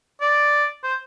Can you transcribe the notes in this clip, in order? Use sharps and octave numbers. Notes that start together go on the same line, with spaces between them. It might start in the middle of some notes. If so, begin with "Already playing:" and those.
D5
C5